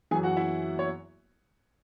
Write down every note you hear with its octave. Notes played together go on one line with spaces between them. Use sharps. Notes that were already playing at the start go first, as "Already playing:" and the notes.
F#2 E3 G#4 G#5
F#4 F#5
E4 E5
C#5